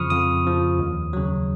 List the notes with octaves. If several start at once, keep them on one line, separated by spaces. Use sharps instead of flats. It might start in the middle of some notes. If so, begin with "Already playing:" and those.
Already playing: F2 C#3 F3 B5 C#6 D#6 F6
F2 D#6
C#3 F3
D#2
C#3 F#3